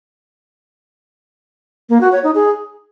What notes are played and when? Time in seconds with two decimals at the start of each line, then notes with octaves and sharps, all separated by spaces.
1.89 A#3
2.01 F#4
2.12 C#5
2.24 D#4
2.35 G#4